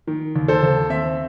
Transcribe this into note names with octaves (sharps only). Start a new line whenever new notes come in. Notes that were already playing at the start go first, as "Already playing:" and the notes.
D#3
D#2
A4 C5
D#2
C4 E5